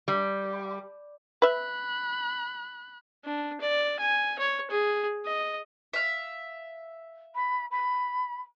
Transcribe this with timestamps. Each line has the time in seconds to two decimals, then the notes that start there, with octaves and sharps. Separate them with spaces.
0.08 G3
1.42 B4 E5 B5 F#6
3.25 D4
3.61 D5
4.00 G#5
4.39 C#5
4.70 G#4
5.26 D#5
5.93 E5 F5
7.35 B5
7.71 B5